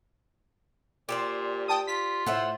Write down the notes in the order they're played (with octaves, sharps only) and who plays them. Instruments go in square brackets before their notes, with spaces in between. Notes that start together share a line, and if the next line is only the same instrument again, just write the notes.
[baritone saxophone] A#2 [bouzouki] G4 C5 D5
[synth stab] G5 A5 D#6
[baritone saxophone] F4 [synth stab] B6
[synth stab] A2 [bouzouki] C5 E5 F#5